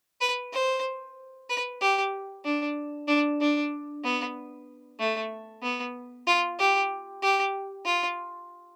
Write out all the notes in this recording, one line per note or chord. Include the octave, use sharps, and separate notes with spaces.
B4
C5
B4
G4
D4
D4
D4
B3
A3
B3
F4
G4
G4
F4